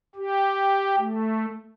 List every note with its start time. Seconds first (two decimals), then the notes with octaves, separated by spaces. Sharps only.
0.15 G4
0.98 A3